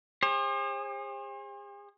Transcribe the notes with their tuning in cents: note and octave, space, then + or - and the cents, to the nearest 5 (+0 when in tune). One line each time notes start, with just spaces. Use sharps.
G#4 -45 C5 +40